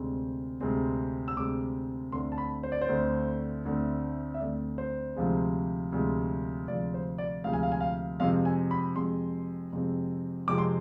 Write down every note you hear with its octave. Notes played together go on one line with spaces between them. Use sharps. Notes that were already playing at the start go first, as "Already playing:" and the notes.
Already playing: D2 C3 G#3 C4
D2 C3 G#3 C4
E6
D2 C3 G#3 C4 D6
D2 D3 A3 C4 C6
A5
B5
C5
D5
C5
D2 D3 A3 C4
D2 D3 A3 C4
E5
D2 D3 A3 C4 D5
C5
D2 C3 F3 G#3
D2 C3 F3 G#3
D2 C3 F3 G#3 D5
C5
D5
D2 C3 F3 G#3 F5
G#5
F5
G#5
F5
F2 C3 G#3 C4 F5
G#5
B5
F2 C3 G#3 C4 C6
F2 C3 G#3 C4
F2 C3 G#3 C4 D6
C6